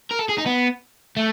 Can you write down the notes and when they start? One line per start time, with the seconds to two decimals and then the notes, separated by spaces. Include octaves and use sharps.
0.11 A#4
0.20 A4
0.29 G#4
0.38 D#4
0.46 B3
1.16 A3